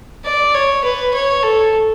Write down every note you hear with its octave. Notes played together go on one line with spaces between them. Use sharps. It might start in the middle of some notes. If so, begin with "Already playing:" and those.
D5
C#5
B4
C#5
A4